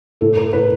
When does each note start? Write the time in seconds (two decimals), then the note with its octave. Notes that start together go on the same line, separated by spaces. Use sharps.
0.21 A2 A4
0.37 A#4
0.53 A2 B4